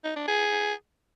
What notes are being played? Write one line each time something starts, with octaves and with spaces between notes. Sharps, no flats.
D#4
D4
G#4